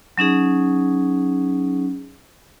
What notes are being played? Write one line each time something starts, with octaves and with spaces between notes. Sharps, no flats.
F#3 C#4 D#4 G#4